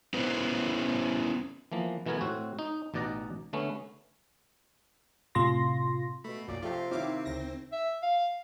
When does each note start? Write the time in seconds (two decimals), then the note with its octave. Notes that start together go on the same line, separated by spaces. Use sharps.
0.14 B3 C#4 E4 B4 C5
1.72 E3 F3 A#3 B3
2.06 B2 E3 A3 B3 A#4 G#5
2.21 A2 C4 F#4
2.59 D#4
2.94 A1 B2 D#4 D5 F#5 A#5
3.53 D3 A3 B3 C#4
5.35 A2 C3 F4 C6 A#6
6.24 B2 A3 B5
6.48 B1 F#2 A#2 D5
6.63 C3 F3 A3 F4 G4
6.91 D#3 C4 E4 C#5 F5 D6
7.25 D2 C#3 A#6
7.72 E5
8.02 F5